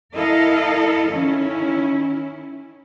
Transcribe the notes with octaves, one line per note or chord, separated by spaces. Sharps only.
E4 A4 A#4 D#5 F5
D#3 C#4 E4